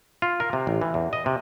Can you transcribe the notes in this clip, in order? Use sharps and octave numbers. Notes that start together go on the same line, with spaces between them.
F4
A#4
C3
A1
E3
E2
D#5
C3